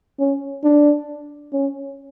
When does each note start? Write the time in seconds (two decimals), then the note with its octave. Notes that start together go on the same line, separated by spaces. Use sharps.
0.19 C#4
0.64 D4
1.53 C#4